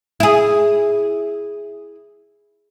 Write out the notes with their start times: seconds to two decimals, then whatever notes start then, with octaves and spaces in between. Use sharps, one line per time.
0.20 E4 G#4